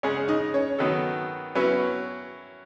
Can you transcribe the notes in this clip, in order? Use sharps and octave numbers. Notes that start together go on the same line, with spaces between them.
C#3 G#3 C#4 G#4
D#4 D#5
C#4 C#5
D#3 F#3 B3 D#4 A4
F#3 B3 C#4 E4 B4